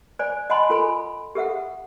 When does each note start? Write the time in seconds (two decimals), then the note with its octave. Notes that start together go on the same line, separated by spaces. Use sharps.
0.19 C5 D5 G#5
0.50 D#5 F#5 G#5 A5 B5 C6
0.70 F4 A4 G#5 B5
1.35 G4 A4 E5 F#5